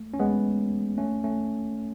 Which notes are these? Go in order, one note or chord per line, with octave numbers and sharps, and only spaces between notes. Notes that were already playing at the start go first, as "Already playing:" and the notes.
Already playing: A3
C#4
G#3 B3
A3 C#4
A3 C#4